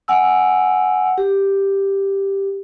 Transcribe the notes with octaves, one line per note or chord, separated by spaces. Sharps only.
F#5 G#5 E6
G4